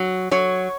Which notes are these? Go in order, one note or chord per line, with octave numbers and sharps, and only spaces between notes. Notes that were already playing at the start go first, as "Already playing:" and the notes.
Already playing: F#3
F#3 C#5